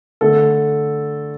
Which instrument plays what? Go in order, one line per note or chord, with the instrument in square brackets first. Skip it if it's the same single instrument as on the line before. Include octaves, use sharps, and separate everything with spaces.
[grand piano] D3 A3 A4